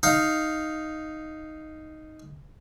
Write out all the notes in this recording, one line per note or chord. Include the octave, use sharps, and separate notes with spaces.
D#4 F5